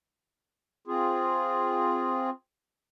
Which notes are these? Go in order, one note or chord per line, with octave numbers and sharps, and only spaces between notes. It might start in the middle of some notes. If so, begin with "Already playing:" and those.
C4 F4 G#4